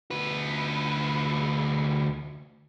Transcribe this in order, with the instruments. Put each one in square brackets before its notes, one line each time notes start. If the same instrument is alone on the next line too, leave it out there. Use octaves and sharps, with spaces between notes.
[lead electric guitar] D2 B4